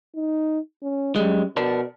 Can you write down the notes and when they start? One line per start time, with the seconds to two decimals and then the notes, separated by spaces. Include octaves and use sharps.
0.16 D#4
0.82 C#4
1.16 F#2 G3 G#3
1.57 B2 A#4 D5 A5